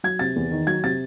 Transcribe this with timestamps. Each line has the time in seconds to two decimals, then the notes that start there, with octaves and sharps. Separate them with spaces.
0.04 F#3 G#6
0.19 C3 A6
0.36 E2
0.51 D#3
0.67 F#3 G#6
0.84 C3 A6